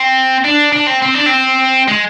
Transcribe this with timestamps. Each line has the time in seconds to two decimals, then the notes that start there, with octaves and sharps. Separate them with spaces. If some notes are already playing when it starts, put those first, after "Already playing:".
Already playing: C4
0.45 D4
0.73 D4
0.87 C4
1.02 C4
1.14 D4
1.26 C4
1.88 G#3